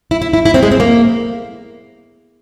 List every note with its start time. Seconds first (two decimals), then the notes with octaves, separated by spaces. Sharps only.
0.11 E4
0.22 E4
0.33 E4
0.45 E4
0.54 C4
0.63 G#3
0.71 C4
0.80 A#3